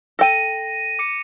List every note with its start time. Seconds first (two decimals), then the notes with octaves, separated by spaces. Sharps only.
0.19 A4 G5 A#6 D#7
0.99 D6 C#7